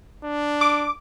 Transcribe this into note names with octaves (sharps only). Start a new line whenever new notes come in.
D4
D6